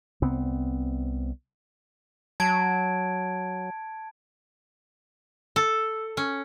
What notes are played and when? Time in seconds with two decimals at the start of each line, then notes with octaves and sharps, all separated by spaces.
0.22 C2 B3 C4
2.40 F#3 A5 G#6 D7
5.56 A4
6.17 C#4